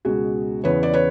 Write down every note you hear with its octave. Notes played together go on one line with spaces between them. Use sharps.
C#2 B2 G#3 F#4 G#4
E2 C#3 E3 B4 C#5
D5
B4 C#5